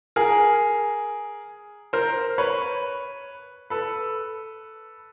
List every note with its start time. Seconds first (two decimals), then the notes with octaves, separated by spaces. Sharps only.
0.16 G#4 A#4
1.93 A#4 C5
2.38 B4 C#5
3.70 A4 B4